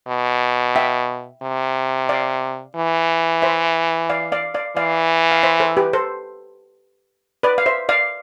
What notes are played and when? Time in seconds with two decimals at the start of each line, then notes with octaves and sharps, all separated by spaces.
0.08 B2
0.76 E5 G5
1.43 C3
2.09 D5 F5
2.76 E3
3.42 C5 E5
4.10 D5 F5
4.32 D5 F5
4.54 D5 F5
4.76 E3 D5 F5
5.31 F5
5.43 C5 E5
5.60 A4 C5
5.77 G4 B4
5.93 A4 C5
7.43 B4 D5
7.58 F5
7.66 C5 E5
7.89 D5 F5